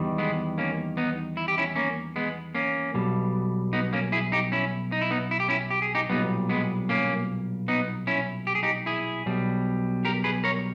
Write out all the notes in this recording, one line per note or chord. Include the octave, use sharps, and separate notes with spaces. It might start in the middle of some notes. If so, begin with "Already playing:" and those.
Already playing: E2 D#3 G3
G#3 B3
A#3 C#4
B3 D#4
E4
G4
C#4 E4
A#3 C#4
G#3 B3
A#3 C#4
B1 B2 G3
B3 D#4
A#3 C#4
E4 G#4
D#4 G4
C#4 E4
D#4
E4
B3 D#4
E4
G4
C#4 E4
G4
G#4
D#4 G4
B1 A#2 G3 B3 D#4
G#3 B3
A#3 C#4
B3 D#4
C#4 E4
G4
G#4
D#4 G4
E4 G#4
B1 B2 G3
G4 A#4
G#4 B4
A#4 C#5